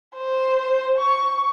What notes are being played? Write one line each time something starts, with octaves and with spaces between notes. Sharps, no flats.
C5
C#6